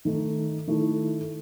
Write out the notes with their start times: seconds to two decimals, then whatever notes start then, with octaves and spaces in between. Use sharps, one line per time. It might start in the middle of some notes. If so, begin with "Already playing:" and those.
0.05 D#3 A3 D#4
0.67 D#3 A3 E4 A4